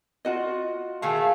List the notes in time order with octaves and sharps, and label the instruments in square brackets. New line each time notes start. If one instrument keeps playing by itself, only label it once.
[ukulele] F4 F#4 D#5
[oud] D#3 G#4 F5 [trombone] A3